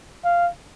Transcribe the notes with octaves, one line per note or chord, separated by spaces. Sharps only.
F5